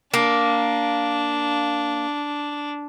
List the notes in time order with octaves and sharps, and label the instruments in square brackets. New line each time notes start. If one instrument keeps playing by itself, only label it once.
[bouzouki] A#3 [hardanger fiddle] D4